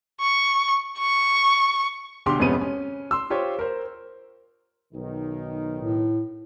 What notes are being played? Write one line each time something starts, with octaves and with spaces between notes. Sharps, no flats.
C#6
C#6
B1 D3 G4 C6 D6
F2 G#2 C3 B3 C#4 D#7
C#4
C6 E6
F4 G4 C5 C#5
A#4 C5
B1 D#3 D#4
A2